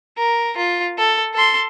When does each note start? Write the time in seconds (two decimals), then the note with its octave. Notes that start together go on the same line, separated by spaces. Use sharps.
0.17 A#4
0.57 F4
0.98 A4
1.34 A4 C6